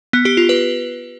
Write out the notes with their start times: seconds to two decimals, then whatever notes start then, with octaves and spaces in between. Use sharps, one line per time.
0.13 B3
0.25 G4
0.37 F4
0.49 B4